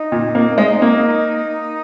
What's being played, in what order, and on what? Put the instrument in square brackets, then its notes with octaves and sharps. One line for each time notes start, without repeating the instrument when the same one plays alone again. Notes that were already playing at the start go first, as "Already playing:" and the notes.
Already playing: [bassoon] D#4
[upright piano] A#2
A#3
G#3
A#3